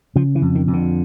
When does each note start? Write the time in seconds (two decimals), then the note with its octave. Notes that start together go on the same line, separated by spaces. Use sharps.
0.16 C#3 F3
0.35 E3
0.42 F2
0.55 D#3
0.68 F2
0.73 D3